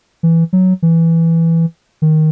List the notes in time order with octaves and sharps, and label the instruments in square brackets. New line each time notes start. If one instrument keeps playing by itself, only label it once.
[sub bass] E3
F#3
E3
D#3